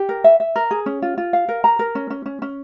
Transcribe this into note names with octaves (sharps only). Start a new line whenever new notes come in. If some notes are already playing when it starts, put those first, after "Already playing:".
Already playing: G4
A#4
E5
E5
A#4
G#4
C#4
F4
F4
F5
A#4
A#5
A#4
C#4
C#4
C#4
C#4